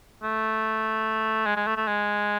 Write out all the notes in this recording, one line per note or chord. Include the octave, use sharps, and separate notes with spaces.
A3
G#3
G#3
A3
A3
G#3